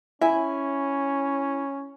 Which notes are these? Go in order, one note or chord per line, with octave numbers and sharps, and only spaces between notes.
C#4 E4 E5 G#5